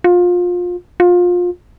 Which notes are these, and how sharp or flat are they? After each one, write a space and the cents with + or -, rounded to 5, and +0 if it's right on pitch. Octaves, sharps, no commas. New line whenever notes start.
F4 +25
F4 +25